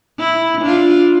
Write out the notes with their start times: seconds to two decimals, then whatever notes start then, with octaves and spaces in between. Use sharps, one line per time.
0.19 E4
0.61 D4 F4